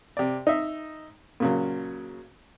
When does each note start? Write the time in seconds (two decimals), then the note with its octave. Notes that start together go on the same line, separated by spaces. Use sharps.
0.17 C3 D5
0.47 D#4 E5
1.40 A#2 C#3 F#3